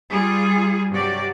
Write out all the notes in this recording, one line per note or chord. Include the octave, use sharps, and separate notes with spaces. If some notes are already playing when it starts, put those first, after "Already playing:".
G3 F4 G#4
G2 C3 F#3 F#4 G4 D5